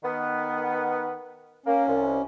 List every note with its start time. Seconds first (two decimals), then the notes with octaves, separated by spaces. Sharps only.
0.03 D#3 B3
1.66 A#3 C#4
1.87 C2